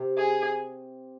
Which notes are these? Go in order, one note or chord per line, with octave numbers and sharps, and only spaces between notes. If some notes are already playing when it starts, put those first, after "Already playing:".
Already playing: C3
G#4